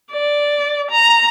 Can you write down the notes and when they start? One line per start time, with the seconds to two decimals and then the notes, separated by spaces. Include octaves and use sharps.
0.12 D5
0.91 A#5